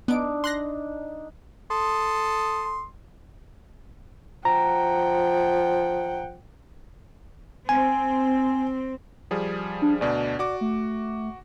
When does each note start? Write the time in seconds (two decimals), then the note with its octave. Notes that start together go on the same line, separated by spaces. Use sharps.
0.08 B3 D4 D#4 D7
0.44 C6 F#6 A#6
1.71 A4 C6 D#6
4.45 F3 F#5 G5 A#5
7.69 C4 G#5
9.31 F3 G3 G#4
9.82 D4
10.01 D2 B2 D4 D5
10.39 F#4 D5 D6
10.61 A3